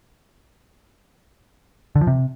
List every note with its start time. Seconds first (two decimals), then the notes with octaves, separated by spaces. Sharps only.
1.96 D3
2.01 F3
2.07 C3